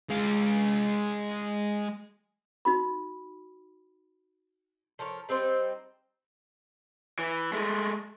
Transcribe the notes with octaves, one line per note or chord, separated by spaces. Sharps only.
G#3 F5
D#4 F#4 B5
F3 A4 A#4 C#5
G3 C4 D#4 C5
E3
G#3 A3